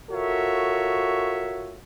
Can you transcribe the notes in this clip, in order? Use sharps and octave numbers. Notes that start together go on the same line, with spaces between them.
F4 F#4 A4 A#4 C#5 E5